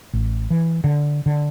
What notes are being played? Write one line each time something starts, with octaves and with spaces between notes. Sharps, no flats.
A1
E3
D3
D3